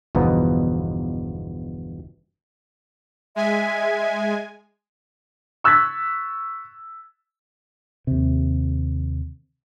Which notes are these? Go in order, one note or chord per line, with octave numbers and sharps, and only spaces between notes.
G1 E2 B2 F3 B3 D#4
G#3 E5 G#5
C#6 E6 F#6 G#6 A6 B6
D#2 C3